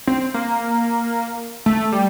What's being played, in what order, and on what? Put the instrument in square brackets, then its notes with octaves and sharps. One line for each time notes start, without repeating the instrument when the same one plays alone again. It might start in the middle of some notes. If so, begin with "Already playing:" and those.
[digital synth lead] C4
A#3
A3
G3